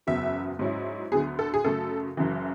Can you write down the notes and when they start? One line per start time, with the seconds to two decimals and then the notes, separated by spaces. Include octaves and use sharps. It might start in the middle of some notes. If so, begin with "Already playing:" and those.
0.07 F#1 E2 C#3 F#3 B3 E5
0.59 G#2 F#3 C#4 E4
1.12 D2 D3 F#3 B3 G#4
1.39 A4
1.54 G#4
1.64 F#2 C#3 F#3 A3 A4
2.17 F#1 F#2 C#3 E3